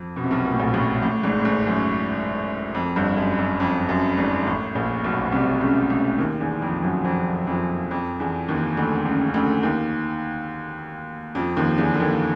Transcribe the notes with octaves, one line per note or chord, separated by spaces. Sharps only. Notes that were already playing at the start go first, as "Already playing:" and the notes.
Already playing: F2 F3
B2
C3
B1 B2
A#2
A2
A#1 A#2
A1 A2
A1 A2
G#1 G#2
A2
G#1 G#2
F#2
F2
G1 G2
F#2
F#2
F2
F#2
G#1 G#2
A1 A2
A#1 A#2
B1 B2
C2 C3
C#2 C#3
C#2 C#3
D#2 D#3
E2 E3
F2 F3
F#2 F#3
F2 F3
F2 F3
F2 F3
E2 E3
D#2 D#3
D2 D3
D3
C#2 C#3
C#3
D2 D3
D#2 D#3
F2 F3
D#2 D#3
E2 E3
D3
D#2 D#3